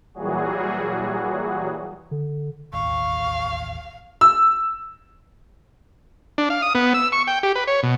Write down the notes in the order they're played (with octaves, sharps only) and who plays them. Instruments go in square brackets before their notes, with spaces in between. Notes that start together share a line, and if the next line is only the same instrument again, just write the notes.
[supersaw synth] A#2 E3 F#3 G3 F#4 G#4
[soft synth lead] D3
[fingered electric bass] E1 A1 D#2 [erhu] F5 [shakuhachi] C#6
[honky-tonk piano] E6
[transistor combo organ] D4
F5
D#6
B3
E6
C#6
G5
G4
B4
C#5
B2